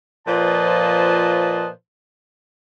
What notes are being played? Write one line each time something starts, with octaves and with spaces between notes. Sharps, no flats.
A#2 F3 B4 C5 D#5 A5